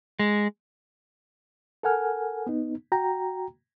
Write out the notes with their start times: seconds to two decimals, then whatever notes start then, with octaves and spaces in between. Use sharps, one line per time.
0.19 G#3
1.83 A4 A#4 F#5 G#5 F6
2.47 B3 D#4
2.92 F#4 G5 A#5